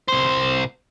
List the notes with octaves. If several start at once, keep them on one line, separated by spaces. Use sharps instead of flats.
C2 C5